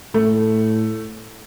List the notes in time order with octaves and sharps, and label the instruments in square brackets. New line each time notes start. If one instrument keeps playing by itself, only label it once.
[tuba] A2 [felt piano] A3